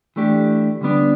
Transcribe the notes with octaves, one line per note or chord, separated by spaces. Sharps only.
E3 A3 D4 G4
D3 G3 B3 D4